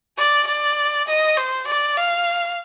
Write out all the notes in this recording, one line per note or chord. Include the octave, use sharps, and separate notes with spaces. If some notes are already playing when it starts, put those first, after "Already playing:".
D5
D5
D#5
C5
D5
F5